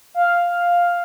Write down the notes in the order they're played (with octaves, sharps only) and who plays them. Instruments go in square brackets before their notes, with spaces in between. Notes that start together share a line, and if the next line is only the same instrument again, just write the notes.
[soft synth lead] F5